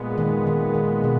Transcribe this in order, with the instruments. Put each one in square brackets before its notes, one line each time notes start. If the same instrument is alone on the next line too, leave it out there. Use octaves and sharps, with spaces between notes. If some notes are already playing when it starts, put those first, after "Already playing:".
Already playing: [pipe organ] A#2 G#3 B3
[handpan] D#3
D#3
D#3
B2